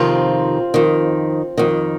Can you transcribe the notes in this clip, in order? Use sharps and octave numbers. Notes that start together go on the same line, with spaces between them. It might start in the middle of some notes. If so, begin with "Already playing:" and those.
Already playing: F2 C3 D#3 C4 F4
F2 D#3
F2 D#3